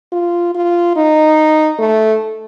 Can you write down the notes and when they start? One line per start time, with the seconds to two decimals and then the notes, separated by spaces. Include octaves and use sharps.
0.12 F4
0.55 F4
0.96 D#4
1.79 A3